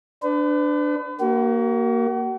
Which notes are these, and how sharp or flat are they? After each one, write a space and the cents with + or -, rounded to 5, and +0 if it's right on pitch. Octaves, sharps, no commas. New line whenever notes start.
D4 +5 B4 +40
A#3 +0 F#4 +40